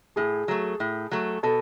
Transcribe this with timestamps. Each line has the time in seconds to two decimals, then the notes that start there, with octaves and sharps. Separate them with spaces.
0.16 A2 G#4
0.48 F#3 A3
0.80 A2
1.11 F#3 A3
1.43 B2 A4